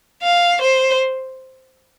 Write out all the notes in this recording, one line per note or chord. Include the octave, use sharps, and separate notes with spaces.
F5
C5